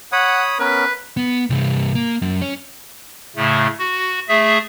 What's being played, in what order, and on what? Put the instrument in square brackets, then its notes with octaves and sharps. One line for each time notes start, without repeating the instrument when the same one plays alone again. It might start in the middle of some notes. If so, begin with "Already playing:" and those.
[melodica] C#5 B5 D#6 [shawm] F#5
[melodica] B3 C#4 A#4 [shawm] B4
[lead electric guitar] B3
C2 G2
A#3
F#2
C#4 C#5
[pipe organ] A2 C#3 A3
F#4
A3 G#4 E5